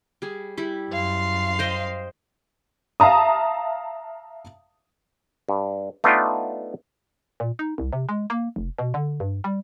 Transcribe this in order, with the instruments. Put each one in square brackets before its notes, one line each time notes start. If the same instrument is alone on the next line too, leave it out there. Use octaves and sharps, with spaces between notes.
[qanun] G3 G#4
G3 E4
[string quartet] F#2 F5 C6
[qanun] C5 D#5 G5
[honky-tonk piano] E5 F5 A5 A#5 D#6
[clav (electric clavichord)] G2
A3 B3 D4 D#4 F4 G5
[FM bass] A#2
D#4
C2
C3
G#3
A#3
F1
B2
D3
G2
G3